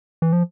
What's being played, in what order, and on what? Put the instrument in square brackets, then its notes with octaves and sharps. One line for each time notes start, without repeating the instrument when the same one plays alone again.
[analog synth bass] E3
F3